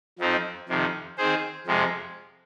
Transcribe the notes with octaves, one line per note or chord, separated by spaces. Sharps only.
F2 F3 C4 D#4
F2 C3 D#3
D#3 C4 G#4 C5
F2 C3 G#3